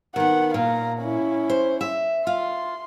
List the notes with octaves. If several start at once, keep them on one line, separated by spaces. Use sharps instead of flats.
D#3 B3 F#5
A#2 F5 A#5
C#4 E4
C5
E5
F4 C6